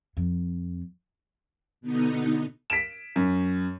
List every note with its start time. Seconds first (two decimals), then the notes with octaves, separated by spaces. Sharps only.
0.17 F2
1.81 B2 D3 B3 D#4
2.70 B6 D7 E7
3.16 F#2